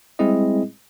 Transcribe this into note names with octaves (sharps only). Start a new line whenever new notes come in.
G3 G#3 C4 E4 G#4 D#5